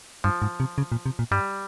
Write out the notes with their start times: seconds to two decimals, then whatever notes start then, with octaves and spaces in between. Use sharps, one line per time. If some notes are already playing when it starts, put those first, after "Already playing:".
0.24 G2 F3
0.42 G#2
0.60 C3
0.78 C#3
0.92 A#2
1.06 C3
1.19 A#2
1.31 G2 G3